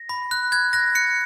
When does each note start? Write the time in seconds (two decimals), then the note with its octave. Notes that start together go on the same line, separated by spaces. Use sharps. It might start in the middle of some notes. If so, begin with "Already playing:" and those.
Already playing: A#6
0.09 B5
0.31 F#6
0.52 F#6 G#6
0.73 F#6 A#6
0.95 F#6 C#7